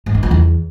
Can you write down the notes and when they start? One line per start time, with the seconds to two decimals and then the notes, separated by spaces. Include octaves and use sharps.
0.06 G#2
0.15 D#3
0.23 F3
0.31 E2